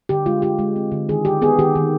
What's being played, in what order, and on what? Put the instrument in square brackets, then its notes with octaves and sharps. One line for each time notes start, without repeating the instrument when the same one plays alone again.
[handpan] D3 G4
G#3 F4
F4 G4
G#3
C4
D3
D#3 G#4
D#3 G4
B3 G#4
D#3 G4
D#3